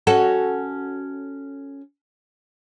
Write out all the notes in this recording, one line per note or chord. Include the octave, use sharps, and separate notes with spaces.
C#4 F#4 A4